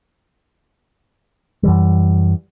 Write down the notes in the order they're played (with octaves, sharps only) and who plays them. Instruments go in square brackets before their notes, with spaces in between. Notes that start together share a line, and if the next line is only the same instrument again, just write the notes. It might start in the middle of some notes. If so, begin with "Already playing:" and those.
[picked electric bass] F#2 E3 G3